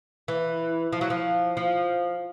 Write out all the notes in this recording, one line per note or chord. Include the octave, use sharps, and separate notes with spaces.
E3
F3
F#3
F3
F3